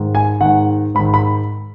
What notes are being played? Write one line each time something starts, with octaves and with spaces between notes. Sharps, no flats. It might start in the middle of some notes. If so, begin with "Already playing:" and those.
Already playing: G#2 D#3
G#5
G#2 D#3 F#5
G#2 D#3 B5
B5